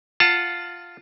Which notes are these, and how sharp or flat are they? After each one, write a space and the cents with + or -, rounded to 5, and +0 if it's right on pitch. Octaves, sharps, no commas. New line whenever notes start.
F4 +0 F#5 +0 A5 +25